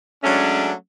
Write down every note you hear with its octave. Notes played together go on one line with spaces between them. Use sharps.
F#3 G#3 A3 C#4 D4